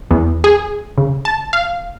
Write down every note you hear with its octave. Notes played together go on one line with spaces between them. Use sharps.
E2
G#4
C#3
A5
F5